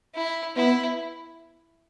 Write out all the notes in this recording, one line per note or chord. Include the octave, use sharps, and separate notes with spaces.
E4
B3 E4